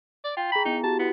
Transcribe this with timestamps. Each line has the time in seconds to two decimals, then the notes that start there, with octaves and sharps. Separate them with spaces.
0.24 D5
0.37 F4 G5
0.52 G#4 A#5 B5
0.65 B3 D#4 E4
0.84 F#4 G4 A5
0.99 B3 E4